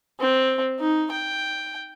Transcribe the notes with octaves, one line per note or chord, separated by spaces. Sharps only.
C4
D#4
G5